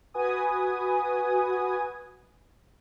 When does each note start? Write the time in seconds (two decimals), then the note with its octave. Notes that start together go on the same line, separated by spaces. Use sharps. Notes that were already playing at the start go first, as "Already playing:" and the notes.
0.14 F#4 B4 G#5 D#6